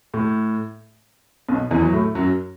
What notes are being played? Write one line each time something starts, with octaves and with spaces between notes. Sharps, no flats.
A2
B1 B2
E2 E3
F#3
A2 A3
F#2 F#3